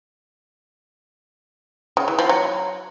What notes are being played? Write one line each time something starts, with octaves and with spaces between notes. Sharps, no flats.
C#3
E3
F3
F#3